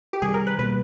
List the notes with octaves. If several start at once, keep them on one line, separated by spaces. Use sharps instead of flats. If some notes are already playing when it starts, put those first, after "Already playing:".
G4
C3 D#3 G3 G#4
A#4
B4
B2 G3 A#3 B4